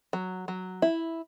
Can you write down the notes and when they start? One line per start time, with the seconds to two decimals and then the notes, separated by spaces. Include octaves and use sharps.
0.13 F#3
0.48 F#3
0.82 E4